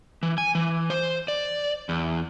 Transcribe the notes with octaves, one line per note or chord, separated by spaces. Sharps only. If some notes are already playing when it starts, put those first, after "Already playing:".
E3
G#5
E3
C5
D5
E2